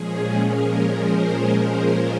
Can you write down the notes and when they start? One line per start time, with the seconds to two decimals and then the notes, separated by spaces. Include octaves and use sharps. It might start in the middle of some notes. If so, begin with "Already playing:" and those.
Already playing: A#2 F3 G#3 C#4 G#4
0.44 A#4
0.99 G#4 C5